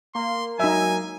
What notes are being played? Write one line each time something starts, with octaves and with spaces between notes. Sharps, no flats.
A#3 C6
F#3 D#4 E5 G#5